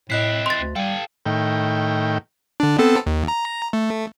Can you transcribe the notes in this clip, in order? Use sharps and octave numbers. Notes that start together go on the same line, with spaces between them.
A2 C4 E4 D#5 F#6 B6
C6 A6
D2
G3 A4 F5 G5 G#5
A2 D#3 G5
D3 D4
B3 C4 A4
D#2
A#5
A3